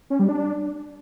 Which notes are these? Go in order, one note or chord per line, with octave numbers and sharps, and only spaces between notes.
C#4
G3
D4